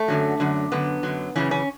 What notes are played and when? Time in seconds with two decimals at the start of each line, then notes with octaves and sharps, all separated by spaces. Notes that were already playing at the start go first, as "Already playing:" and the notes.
Already playing: A3
0.08 F#2 D3 F#3
0.40 F#2 D3 F#3
0.72 F#2 D3 F#3 B3
1.03 F#2 D3 F#3
1.36 F#2 C#3 E3 C#4
1.51 C#4